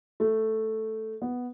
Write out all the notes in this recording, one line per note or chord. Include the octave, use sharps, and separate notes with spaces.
A3
B3